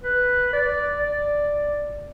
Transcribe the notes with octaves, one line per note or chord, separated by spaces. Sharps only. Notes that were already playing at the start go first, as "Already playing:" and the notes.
B4
D5
D5